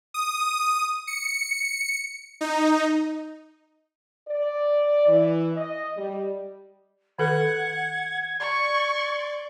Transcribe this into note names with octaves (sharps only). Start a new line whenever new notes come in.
D#6
C#7
D#4
D5
E3
D#5
G3
D#3 A4 B4 F#5 G#6
D5 C#6